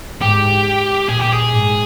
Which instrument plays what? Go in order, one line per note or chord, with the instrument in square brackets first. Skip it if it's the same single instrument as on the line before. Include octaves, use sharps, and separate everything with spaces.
[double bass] G#2 [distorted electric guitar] G4
[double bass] A#2 [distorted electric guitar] G#4
[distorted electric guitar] G4
G#4
[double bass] G#2